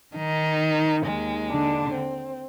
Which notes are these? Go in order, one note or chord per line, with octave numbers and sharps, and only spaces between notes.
D#3 D#4
D#2 D#3 G#3
D3 D4
C4